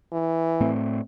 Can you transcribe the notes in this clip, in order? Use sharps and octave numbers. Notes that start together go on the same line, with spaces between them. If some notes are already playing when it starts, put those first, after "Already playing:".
E3
A2 A3 C4